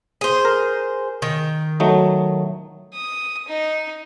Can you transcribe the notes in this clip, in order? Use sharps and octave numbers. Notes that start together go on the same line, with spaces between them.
G#4 C5
A#4
D#3
F#3 A3 D#4
D#6
D#4